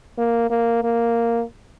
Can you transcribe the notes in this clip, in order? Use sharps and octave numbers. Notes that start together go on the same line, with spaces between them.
A#3
A#3
A#3